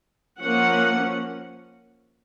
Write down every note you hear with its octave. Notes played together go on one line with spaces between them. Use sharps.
F3 A#3 C#4 F#5